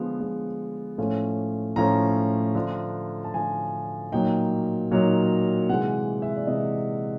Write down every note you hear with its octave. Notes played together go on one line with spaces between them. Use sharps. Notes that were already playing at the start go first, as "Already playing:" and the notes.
Already playing: D3 F3 G#3 B3
D3 F3 G#3 B3
A2 F3 A3 C#4
A2 F3 A3 C#4 A#5
D3 F3 A3 D4
A5
D3 F3 A3 D4 G#5
A#2 F#3 A#3 D#4 G5
A#2 F#3 A#3 D#4
C3 E3 G#3 F#5
E5
D5
C3 E3 G#3 D#5